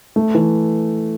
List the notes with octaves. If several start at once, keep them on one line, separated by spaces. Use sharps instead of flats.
A3
E3